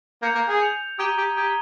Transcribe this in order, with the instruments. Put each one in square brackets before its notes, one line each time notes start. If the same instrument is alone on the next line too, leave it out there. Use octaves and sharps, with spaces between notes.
[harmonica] A#3 [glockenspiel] G6 C#7 F7
[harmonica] A#3
G#4
[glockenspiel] G6 C#7 F7
[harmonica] G4 [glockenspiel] A#5 D#6 G#6 D#7 G7
[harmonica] G4
[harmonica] G4 [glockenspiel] A#5 D#6 G#6 D#7 G7